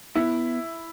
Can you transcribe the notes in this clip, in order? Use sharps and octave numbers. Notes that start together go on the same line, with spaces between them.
B3 E4